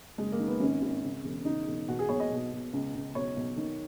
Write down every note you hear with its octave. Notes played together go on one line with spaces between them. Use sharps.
F#1 G#3
A#3
D#3
B3
G#1 C#4
G#1
C#3
E1
C#3 D#4
E1
B2 F#4
G#4
B1 C#5
D#5
B2
B2
C#2
C#2
B1 C#5
B1
D#3